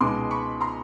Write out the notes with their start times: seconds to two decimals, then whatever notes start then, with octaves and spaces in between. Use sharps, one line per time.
0.01 C#2 B2 G#3 B3 D#4 C6 D6
0.31 B5 C#6
0.61 A#5 C6